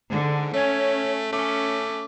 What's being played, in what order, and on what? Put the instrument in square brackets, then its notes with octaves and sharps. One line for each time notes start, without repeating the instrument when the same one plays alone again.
[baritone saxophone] G#2 [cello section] D3
[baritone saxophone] A3 [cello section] C#4 [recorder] C#5
[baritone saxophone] A3 [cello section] C#4 [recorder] D6